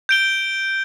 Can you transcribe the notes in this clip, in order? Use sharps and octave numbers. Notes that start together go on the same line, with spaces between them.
G6 D7 G7